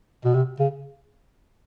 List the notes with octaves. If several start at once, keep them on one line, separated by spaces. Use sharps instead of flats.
B2
C3
C#3